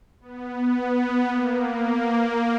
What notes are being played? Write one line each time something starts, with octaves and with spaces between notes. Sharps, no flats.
B3
A#3